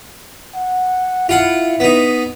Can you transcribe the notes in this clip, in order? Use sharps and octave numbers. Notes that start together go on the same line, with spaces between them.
F#5
E4 F4 F#5
B3 D#4